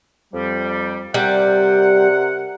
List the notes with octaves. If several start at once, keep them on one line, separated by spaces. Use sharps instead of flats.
F2 G3
C3 G3 A#4 F#5